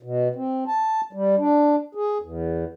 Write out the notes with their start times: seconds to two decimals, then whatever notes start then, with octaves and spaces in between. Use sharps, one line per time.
0.03 B2
0.35 C4
0.68 A5
1.13 G3
1.38 D4
1.95 G#4
2.22 E2